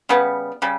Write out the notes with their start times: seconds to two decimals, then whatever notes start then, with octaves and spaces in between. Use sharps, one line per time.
0.09 C#3 G3 B3
0.62 C#3 G3